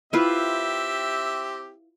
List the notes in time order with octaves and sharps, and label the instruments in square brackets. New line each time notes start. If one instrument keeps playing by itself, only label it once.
[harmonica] C4 G4 E5 [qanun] E4 F4 B4